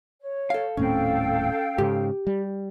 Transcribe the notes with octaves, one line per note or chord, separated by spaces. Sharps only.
C#5
A4 F5
D#1 A2 C4 C#4 A4 F5 G5
G#2 C#3 G4
G3